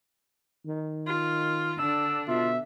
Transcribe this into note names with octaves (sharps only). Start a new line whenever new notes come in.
D#3
F4
D3 D4 E6
B2 F4 E5